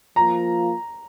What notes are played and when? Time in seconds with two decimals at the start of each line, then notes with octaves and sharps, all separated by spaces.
0.16 F3 A#3 F4 A#5